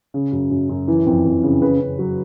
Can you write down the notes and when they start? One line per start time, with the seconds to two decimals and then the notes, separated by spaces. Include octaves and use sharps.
0.14 C#3
0.32 F#2
0.51 F#2
0.69 F#2
0.88 E3
1.06 F2
1.25 F2
1.43 C#3
1.62 C#3 B4
1.80 C#3
1.99 F#3